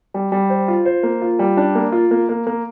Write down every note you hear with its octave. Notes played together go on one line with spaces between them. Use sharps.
G3
G3
C5
F4
C5
A#3
F4
G3
D4
A#3
F4
A#3
A#3
A#3